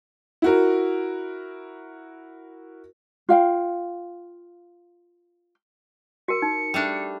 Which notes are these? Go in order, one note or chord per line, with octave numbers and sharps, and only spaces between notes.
E4 F#4 A#4
F4 F5 G5
F#4 A#4 C#7
D#4
G3 A3 D4